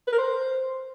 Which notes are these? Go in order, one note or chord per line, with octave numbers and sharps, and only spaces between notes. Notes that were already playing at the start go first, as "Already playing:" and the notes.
B4
A#4
C5